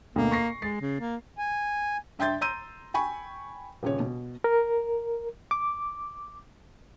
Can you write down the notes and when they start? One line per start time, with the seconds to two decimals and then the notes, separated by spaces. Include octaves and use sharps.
0.16 D2 B2 A#3
0.31 C#6 A#6 C7
0.62 G#3 A6 C7
0.81 C#3
1.00 A#3
1.38 G#5
2.19 G2 E5 G5 C6 G6 A6
2.41 A#5 C6 E6 G6 D#7
2.94 G5 G#5 B5 C#6
3.83 D#1 C#3 C#5
4.00 B2
4.44 A#4
5.51 D6